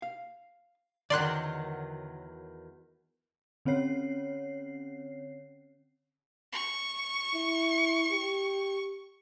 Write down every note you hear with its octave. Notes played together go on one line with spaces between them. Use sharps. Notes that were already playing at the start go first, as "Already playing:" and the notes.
F5
E2 D3 D#3 F#3 D5 C6 F#6
D3 C4 C#4 C#5 C7
C#6
E4
G4